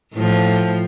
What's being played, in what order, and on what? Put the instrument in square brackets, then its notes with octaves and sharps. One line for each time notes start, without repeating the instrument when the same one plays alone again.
[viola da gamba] A2 F3